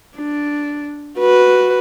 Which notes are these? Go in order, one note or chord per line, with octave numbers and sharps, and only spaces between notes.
D4
F#4 B4